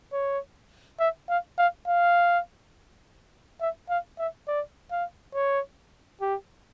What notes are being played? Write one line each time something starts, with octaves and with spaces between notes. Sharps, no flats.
C#5
E5
F5
F5
F5
E5
F5
E5
D5
F5
C#5
G4